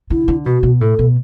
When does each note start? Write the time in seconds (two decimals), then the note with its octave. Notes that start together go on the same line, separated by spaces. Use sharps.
0.10 D3 E4
0.28 D3
0.46 B2 F#4
0.63 B2
0.81 A2 A4
0.99 B2